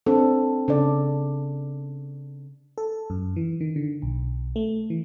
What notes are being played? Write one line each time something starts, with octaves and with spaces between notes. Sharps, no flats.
C4 D4 A4
C#3 D4 A4 D5
A4
F#2
E3
D#3
D3
B1
A3
E3